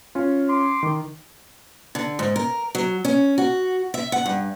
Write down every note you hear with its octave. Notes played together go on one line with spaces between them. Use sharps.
C#4 F4
C6 D6
D#3
D3
G#2
A#4
F#3
C#4
F#4
E5
F#5
G2